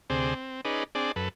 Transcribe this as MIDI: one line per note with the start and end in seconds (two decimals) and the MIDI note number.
0.10 0.34 38
0.10 0.34 48
0.10 0.34 60
0.10 0.34 68
0.10 0.34 72
0.10 0.34 74
0.34 0.61 60
0.65 0.84 61
0.65 0.84 63
0.65 0.84 68
0.65 0.84 71
0.65 0.84 74
0.95 1.12 60
0.95 1.12 62
0.95 1.12 68
0.95 1.12 74
1.16 1.29 42
1.16 1.29 69
1.16 1.29 71